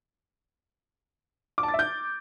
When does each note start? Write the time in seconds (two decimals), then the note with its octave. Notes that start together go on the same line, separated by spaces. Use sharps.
1.58 D6
1.63 A5
1.68 A6
1.74 E5
1.79 G6